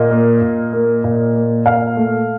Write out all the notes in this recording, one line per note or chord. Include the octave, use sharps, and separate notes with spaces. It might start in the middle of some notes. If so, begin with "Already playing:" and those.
Already playing: A#2 D#5
A#3
A#2
A#3
A#2
A#3
A#2 F5
A3